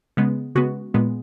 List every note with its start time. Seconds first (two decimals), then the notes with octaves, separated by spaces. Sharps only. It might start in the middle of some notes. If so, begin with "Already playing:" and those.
0.17 C#3 G#3 B3
0.55 C#3 G#3 B3 F#4
0.94 A#2 G#3 B3